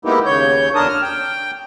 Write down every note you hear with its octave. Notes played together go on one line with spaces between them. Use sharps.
G#3 A#3 B3 D#4 E4 G4
D#2 C#3 C#5 G6
E2 D3 D4 A#4 A5 D#6
F6
G5